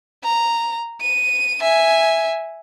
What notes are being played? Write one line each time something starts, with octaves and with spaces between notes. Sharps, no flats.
A#5
D#7
E5 G#5